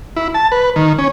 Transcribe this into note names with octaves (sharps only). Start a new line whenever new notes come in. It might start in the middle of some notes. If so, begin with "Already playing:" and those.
E4
A5
B4
D#3
C#4